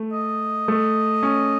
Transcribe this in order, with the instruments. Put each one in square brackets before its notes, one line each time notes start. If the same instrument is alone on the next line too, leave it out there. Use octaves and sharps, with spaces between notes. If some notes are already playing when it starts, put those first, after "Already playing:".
Already playing: [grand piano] A3
[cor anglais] D#5
[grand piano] A3
C#4